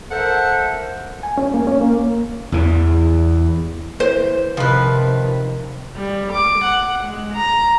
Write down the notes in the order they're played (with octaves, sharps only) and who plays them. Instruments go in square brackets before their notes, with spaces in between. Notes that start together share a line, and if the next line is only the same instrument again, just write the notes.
[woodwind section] A4 A#4 C5 E5 F#5
[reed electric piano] G#5
C#4
A#3
C#4
A#3
[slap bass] E2 E3
[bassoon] E3 [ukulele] C5
[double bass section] C3 [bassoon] D#3 [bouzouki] F3 B4
[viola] G3
D6
F#5
G#3
A#5